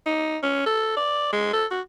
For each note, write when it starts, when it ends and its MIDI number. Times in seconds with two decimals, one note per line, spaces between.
0.06 0.38 63
0.43 0.66 61
0.66 0.95 69
0.97 1.31 74
1.33 1.52 56
1.53 1.65 69
1.71 1.81 66